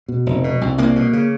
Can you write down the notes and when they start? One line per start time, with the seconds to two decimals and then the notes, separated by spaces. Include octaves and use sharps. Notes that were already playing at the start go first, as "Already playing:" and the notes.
0.08 B2
0.26 F1
0.44 B2
0.61 C2
0.78 C2 A#3
0.96 B2
1.13 C#3